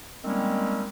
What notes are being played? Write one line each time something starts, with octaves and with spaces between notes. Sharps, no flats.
D#3 G3 G#3 A#3 C4 C#4